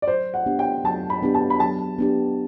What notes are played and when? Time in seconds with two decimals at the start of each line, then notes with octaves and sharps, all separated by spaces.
0.02 D5
0.08 F#3 C5
0.34 F#5
0.46 B3 D4 G4
0.59 G5
0.84 F#3 A5
1.10 B5
1.22 B3 D4 G4
1.35 A5
1.50 B5
1.60 F#3 A5
1.98 B3 D4 G4